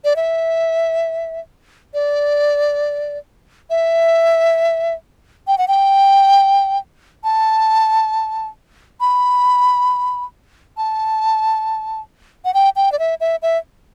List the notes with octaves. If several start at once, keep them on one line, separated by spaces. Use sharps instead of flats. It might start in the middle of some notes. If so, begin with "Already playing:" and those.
D5
E5
D5
E5
G5
F#5
G5
A5
B5
A5
F#5
G5
G5
D5
E5
E5
E5